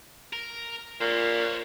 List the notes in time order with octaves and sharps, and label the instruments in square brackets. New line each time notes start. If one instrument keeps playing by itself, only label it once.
[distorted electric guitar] A#4
[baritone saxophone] A#2 [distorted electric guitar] C5 C#5